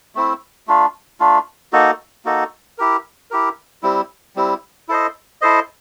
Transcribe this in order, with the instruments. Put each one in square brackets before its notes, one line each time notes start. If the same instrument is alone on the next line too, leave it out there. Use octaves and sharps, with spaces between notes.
[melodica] A3 C4 E4
A3 D4 F4
A3 D4 F4
A#3 D#4 F#4 A4
A#3 D#4 F#4 A4
E4 G4 A#4
E4 G4 A#4
G3 C4 E4
G3 C4 E4
E4 A4 C5 D#5
E4 A4 C5 D#5